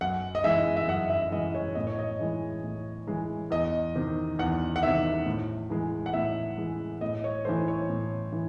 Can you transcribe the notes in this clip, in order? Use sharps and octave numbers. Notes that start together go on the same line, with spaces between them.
F#2 F#5
D#5
E3 G#3 E5
E5
F#2 F#5
E5
E3 G#3 D#5
C#5
A2 D#5
C#5
D#5
E3 G#3
A2
E3 G#3
E2 D#5
C3 D#3
E2 F#5
F#5
C3 D#3 E5
A2
E3 G#3
F#5
A2 E5
E3 G#3
A2 D#5
C#5
E3 A3 C5
C#5
A2
E3